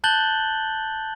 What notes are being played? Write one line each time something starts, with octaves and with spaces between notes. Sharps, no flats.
A5 F#6 G6 A6 F#7 G7